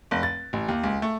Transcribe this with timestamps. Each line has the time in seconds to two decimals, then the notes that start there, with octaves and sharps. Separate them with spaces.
0.11 F1
0.23 A6
0.53 A1
0.68 D#2
0.84 C#2
1.02 A3